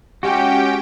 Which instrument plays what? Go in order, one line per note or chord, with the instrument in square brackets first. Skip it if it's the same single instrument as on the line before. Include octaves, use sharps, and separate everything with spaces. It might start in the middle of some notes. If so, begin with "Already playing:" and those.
[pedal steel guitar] G#3 F#4 [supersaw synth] C#4 G4 G5